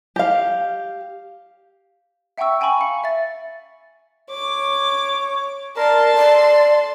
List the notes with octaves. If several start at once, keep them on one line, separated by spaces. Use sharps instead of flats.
G4 F5
E5 F#5 G5 A#5 C#6 E6
G5 G#5 A#5 B5 C#6
F5 C#7
E5 A6
C#5 D6
A#4 D5 A5 C6
A4 D5